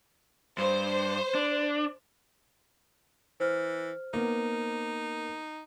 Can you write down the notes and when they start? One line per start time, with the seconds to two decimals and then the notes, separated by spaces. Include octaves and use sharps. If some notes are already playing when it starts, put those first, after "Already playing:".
0.58 G2 C5
1.35 D4
3.40 E3 C5 F6
4.14 A#3 B3 D#4